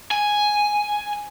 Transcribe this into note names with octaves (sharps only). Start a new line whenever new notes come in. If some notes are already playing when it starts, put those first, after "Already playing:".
G#5